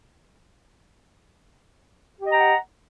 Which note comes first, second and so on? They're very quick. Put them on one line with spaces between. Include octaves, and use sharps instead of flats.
G4 D#5 A#5 G5 F#5